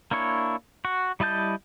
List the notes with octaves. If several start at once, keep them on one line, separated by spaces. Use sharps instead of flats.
A#3 D4 E4 C#5
F#4
G3 E4 D#5 A5 G6